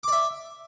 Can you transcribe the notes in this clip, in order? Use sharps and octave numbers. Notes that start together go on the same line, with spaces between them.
D5 E5 D6